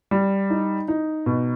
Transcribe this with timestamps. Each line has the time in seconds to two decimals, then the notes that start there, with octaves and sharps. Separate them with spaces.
0.11 G3
0.50 D#4
0.88 D#4
1.26 B2